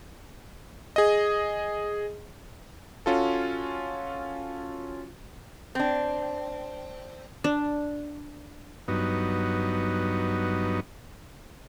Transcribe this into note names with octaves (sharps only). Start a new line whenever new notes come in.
G#4 D#5
C#4 F4 F#4 A4
C4 D4
D4
G2 F#3 B3 D#4